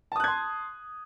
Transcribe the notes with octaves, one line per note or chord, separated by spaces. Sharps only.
A5 C6 D#6 F#6 G#6